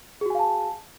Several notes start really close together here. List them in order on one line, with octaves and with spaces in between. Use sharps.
G#4 F#4 G#5 F5 A5